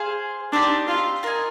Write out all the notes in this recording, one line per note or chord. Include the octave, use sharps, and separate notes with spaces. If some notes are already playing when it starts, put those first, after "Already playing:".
Already playing: G#4 C5 F5
C4 D4 D#4 G4
F4
F4 A#4 D#5 G#5